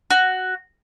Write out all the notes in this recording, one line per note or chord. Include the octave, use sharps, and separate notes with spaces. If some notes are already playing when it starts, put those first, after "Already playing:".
F#4